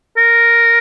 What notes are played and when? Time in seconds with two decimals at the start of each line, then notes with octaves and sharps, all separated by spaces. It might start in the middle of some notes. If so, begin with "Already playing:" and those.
0.17 A#4